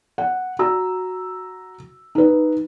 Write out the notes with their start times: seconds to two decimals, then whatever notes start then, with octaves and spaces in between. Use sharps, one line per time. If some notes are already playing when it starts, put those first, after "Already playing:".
0.18 F#5
0.59 F#4 A#5 E6
2.15 D#4 B4